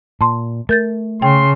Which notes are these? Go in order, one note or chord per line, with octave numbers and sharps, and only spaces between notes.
A#2 A5 C6
A3 A#4 G6 A6
C#3 G5 C6